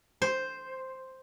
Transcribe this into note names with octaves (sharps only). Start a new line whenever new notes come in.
C5